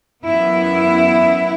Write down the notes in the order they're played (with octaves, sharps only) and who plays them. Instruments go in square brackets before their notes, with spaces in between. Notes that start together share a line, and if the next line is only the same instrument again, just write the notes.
[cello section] F#2 E3 B3 E4